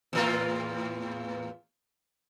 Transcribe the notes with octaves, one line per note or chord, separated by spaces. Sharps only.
E2 A2 F4